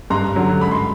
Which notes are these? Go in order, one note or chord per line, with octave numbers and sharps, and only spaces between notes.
G2 A#5 C6
D3 F#3
G#2 B5
C6